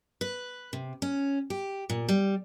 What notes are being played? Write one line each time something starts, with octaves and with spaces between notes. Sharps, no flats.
B4
C3
C#4
G4
A#2
G3